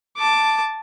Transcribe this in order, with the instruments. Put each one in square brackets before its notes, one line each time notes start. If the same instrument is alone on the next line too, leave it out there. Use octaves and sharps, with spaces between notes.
[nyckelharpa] A5 D6